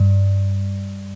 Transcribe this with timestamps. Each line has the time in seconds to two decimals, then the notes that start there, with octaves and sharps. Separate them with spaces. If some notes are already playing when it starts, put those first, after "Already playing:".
Already playing: G2